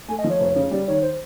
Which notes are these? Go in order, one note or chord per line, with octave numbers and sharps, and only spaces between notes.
A3 G#5
D#5
F3
C#5
F1
C#3
G3 D5
D#3 C#5
C5